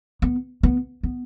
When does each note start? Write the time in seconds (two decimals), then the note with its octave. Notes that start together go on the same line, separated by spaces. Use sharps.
0.22 B3
0.63 B3
1.03 B3